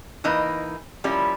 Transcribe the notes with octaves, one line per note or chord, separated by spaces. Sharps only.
E3 A#3 D#4 B4
F3 G3 A#3 C#4 E4